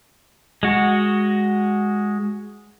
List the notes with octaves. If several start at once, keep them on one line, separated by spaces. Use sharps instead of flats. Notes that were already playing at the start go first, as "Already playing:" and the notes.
G#3 F#4